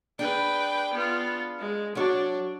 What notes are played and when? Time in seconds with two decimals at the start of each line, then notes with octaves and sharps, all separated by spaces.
0.19 D4 G#4 B4 G5
0.94 B3 F4
1.59 G#3
1.95 F#3 D4 C#5